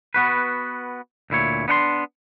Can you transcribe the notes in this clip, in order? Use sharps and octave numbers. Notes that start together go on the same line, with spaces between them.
B3 F#4 B4
D2 A#2 E4 C#5
B3 D4 F#5 C6